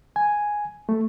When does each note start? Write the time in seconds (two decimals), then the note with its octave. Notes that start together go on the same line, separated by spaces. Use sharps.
0.16 G#5
0.89 A3